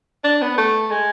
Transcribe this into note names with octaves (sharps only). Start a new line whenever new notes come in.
D4
B3
A3
G#3